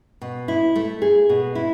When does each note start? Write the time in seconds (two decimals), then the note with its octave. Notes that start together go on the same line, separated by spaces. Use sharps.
0.22 B2
0.48 E4
0.76 A3
1.02 G#4
1.29 B2
1.55 E4